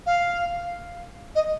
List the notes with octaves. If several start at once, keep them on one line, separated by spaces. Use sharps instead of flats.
F5
D#5